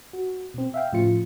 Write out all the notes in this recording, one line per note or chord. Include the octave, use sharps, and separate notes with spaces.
F#4
B2 C4
E5 F5 G5
A2 C#3 F3 F4 C#7